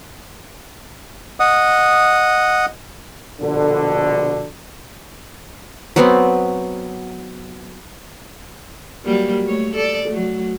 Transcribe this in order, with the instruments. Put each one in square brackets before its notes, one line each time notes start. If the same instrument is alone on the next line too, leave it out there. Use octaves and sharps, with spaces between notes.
[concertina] D#5 F#5 D#6
[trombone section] A#1 B2 D3
[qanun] F#3 B3 C4
[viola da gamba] F#3 G3 A#3
A3 C#5
A4 D5
F#3 A3